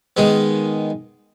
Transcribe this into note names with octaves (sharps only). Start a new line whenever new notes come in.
D#3 G#3 B3